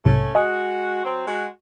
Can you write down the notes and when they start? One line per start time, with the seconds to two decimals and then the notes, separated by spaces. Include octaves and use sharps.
0.05 B1 G#2 C3 A3 C#4
0.35 G#3 F#4 D#5 G#5 D#6
1.05 F#3 C4
1.27 G#3 F#4